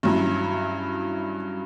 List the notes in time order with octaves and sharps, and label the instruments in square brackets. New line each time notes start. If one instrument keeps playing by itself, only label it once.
[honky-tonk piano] G2 F#3 C#4 E4